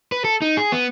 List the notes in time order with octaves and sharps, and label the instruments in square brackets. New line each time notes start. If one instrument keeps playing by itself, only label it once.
[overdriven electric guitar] B4
A4
D#4
G#4
B3